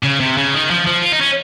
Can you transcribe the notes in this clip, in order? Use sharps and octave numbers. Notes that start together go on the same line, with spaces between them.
C#3
C3
C#3
D#3
F3
F3
F4
D#4
C#4